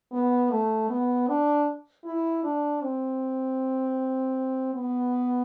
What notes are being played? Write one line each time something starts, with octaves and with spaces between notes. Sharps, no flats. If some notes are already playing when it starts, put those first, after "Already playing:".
B3
A3
B3
D4
E4
D4
C4
B3